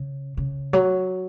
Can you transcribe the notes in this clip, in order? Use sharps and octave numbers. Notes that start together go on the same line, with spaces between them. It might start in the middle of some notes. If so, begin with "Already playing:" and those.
Already playing: C#3
C#3
F#3